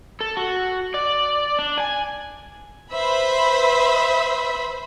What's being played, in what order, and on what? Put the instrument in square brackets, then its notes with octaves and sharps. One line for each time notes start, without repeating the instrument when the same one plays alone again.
[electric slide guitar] A4
F#4
D5
D4
G#5
[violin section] B4 C5 E5 B5